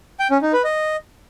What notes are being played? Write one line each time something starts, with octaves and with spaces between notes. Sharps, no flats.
G5
C#4
D#4
B4
D#5